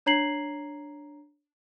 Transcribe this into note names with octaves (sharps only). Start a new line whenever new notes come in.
D4 C#5 A#5 G#6 C7 F#7